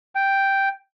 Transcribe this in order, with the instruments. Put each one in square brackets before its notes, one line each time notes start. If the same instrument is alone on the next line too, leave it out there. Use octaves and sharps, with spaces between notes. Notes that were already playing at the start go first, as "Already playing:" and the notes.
[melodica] G5